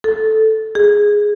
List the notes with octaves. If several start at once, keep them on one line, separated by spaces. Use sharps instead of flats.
A4
G#4